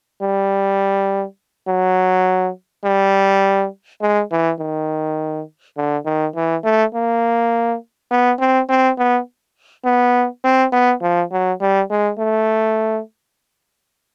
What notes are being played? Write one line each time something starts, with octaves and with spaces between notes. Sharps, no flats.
G3
F#3
G3
G#3
E3
D#3
D3
D#3
E3
A3
A#3
B3
C4
C4
B3
B3
C4
B3
F3
F#3
G3
G#3
A3